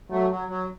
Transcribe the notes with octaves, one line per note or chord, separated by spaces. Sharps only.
F#3 A3
F#3
F#3